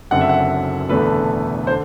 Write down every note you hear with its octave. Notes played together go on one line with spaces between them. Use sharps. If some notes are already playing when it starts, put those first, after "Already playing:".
F#1 F#2 D3 F#3 C4 F#5
E5
F#5
E1 E2 D3 A3 B4
D3 C5